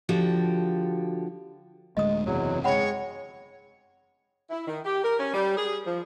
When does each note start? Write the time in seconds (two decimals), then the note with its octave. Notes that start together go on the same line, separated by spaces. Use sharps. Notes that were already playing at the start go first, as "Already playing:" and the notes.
0.09 D3 F3 F#4 G4
1.97 D1 D2 G#3 D#5 D#6
2.26 F#1 E2 C3 F#3
2.64 G#3 C#5 F#5 G5 B5
4.50 E4
4.67 D#3
4.85 G4
5.04 A#4
5.19 C#4
5.34 G3
5.57 G#4
5.85 F3